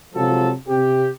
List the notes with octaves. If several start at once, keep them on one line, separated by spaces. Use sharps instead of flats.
C3 F3 F#3 G#3 F4 A4
C3 G4